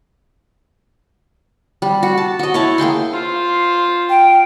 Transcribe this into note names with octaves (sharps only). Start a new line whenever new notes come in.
G3
F#4
A5
F#4 D#5
E4 C#5 A5
A#3 G#4 G5 C6
F4 C5
G5